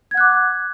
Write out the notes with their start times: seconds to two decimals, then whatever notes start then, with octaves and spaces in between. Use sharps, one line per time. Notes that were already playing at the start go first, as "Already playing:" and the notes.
0.11 G#6
0.14 F#5
0.17 F#6
0.21 D6